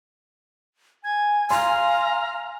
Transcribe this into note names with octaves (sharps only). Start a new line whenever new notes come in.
G#5 G#6
F5 A#5 C6